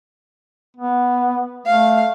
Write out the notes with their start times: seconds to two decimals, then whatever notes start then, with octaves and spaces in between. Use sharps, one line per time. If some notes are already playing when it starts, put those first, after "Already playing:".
0.77 B3
1.66 A3 F5